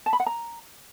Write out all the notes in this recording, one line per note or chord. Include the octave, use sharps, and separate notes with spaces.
A5
B5
F#5
A#5